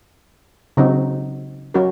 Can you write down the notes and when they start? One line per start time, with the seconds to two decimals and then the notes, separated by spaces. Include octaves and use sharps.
0.77 C#3 F#3 C4 D#4 F#4
1.74 F#3 C#4 F#4 A#4